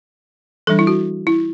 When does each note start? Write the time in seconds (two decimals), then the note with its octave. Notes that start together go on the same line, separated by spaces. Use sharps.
0.67 E3 G3 D4 A4
0.79 E4
0.87 F#4
1.27 E4